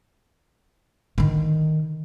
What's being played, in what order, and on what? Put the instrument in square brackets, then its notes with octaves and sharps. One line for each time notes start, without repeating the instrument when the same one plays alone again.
[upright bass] D3 D#3